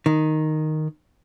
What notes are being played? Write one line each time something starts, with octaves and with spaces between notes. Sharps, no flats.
D#3